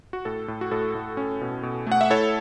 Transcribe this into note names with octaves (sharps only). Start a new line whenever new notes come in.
F#4
A2 A4
A2
F#4
A2 A4
A2
C#4
B2
B2
A3 F#5
E5
E4 A4 C#5